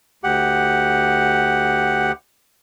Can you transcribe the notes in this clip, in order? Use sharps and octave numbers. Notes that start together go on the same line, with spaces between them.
D2 G4 F#5